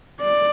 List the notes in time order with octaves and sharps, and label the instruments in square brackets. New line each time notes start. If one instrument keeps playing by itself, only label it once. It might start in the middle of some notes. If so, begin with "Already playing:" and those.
[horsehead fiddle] D5